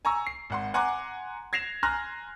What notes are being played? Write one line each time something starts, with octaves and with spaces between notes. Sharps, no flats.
G#5 A#5 C#6 E6
C7
G#1 F#5 C6
F#5 G#5 A#5 C6 D6 F#6
G#6 A#6 C7 E7 F7
G#5 A#5 C6 F6 F#6 A#6